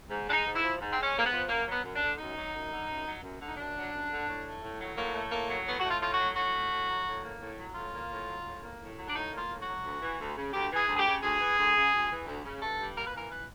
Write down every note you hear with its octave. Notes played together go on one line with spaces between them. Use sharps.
G#2
G#3 D4
D#4
G#2
E4
F3
G#2
C4
G#3
C#4
G#2 A#3
B3
F3
F#2 A#3
F#3
B3
F#2
D4
D3
F#2 D#4
F#3
F#2
D3
F#2
F#3
F#2
D3
D#4
F#2 D4
F#3
F#2
D3
A2
A3
A2
F#3
A2 A#3
A3
A2 A#3
F#3
A2 B3
F#4
A3
F4
A2 F4
F#4
F#3
A2 F#4
A3
A2
F#3
A2
A#3
A2
F#3
A2 F4
A#3
A2
F#3
A2
A#3
A2
F#3
D4
A2 D#4
A#3
F4
A2
F#4
F#3
D2
E3
D2
C#3
D2 G4
E3
G#4
D2
G#4
G4
C#3
D2 G#4
E3
D2
C#3
D2
E3
D2
C#3
G2 A4
G3
A#3 A#4
B4
E3 A#4
B4